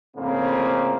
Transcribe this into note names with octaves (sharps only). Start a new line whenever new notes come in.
F2 A2 C#3 A#3 C4